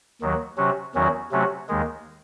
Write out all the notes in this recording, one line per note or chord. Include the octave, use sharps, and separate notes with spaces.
D#2 D#3 F#3
C3 F#3 C#4 F#4
E2 D#3 F#3 C#4 F#4
C3 F#3 A3 C#4 F#4
D#2 D#3 G#3